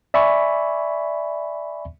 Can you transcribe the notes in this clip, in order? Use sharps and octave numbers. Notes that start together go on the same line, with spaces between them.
D5 E5 G#5 B5 C#6